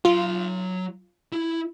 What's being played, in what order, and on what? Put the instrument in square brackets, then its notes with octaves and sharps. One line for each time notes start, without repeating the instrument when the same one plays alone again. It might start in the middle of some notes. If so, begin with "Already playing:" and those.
[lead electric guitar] F#3 C6 [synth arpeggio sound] F4
[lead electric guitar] E4